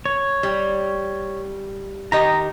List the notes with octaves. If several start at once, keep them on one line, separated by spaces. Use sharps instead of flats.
C#5
G3
D#3 G4 D#5 A#5